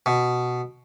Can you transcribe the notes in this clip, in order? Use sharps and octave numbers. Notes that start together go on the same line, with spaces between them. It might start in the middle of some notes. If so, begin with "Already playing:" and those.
B2